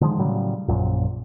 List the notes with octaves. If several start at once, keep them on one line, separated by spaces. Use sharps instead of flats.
D3 D#3 F3 G#3
A2 C#3 F#3 G3
A#1 F#2 A#2